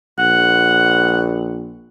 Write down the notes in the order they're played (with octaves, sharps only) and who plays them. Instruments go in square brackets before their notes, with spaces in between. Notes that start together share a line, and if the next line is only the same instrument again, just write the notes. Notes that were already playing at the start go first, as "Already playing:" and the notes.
[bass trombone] A#1 [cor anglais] F#5